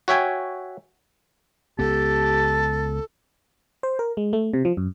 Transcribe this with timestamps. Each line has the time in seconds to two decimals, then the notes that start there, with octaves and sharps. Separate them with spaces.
0.08 F#4 C#5 E5 G5 G#5
1.79 C#2 B3 G4 A4 A5
3.83 C5
3.99 A#4
4.17 G#3
4.33 A3
4.53 C3
4.65 F3
4.77 F#2